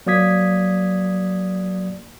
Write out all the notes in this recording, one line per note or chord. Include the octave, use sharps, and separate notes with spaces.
F#3 A#3 D5 D#6 G#6 B6